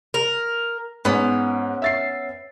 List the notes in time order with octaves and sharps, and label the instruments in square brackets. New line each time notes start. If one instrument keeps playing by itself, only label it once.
[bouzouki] A#4
[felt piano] G#2 [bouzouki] B3 C#4
[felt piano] E5 A6 C7